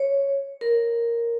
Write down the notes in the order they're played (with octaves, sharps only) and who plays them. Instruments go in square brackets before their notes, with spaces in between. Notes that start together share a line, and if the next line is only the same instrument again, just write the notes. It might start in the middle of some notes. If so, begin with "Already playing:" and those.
Already playing: [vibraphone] C#5
A#4